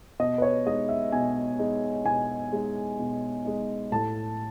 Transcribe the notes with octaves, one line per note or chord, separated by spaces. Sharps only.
B2 D#5
B4
C#5
G#3 D#4 D#5
E5
B2 G#5
G#3 D#4
B2 G#5
G#3 D#4
B2
G#3 D#4
A2 A5